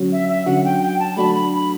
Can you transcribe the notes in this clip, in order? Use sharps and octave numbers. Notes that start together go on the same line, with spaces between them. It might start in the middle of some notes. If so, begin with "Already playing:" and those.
Already playing: D3 F#3 C#4 F#4
E5
E5
D3 F#3 C#4 F#4 F#5
G5
G5
A5
F#3 A3 D4 F#4 B5
B5
B5